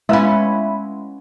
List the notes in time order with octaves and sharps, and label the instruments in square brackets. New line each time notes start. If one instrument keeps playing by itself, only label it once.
[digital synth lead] G#3 [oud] B3 C#4 [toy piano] E4 B4 F5 [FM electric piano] E5 B5